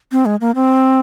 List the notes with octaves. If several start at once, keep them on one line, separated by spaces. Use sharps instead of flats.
C4
G#3
A#3
C4